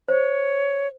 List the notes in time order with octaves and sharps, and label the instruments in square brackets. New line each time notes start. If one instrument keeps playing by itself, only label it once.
[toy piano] C5 [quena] C#5